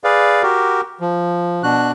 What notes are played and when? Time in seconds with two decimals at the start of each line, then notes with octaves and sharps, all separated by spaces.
0.04 G#4 B4 D5 F5
0.43 F#4 G4 A#4
1.00 F3
1.63 B2 D4 F#4 F#6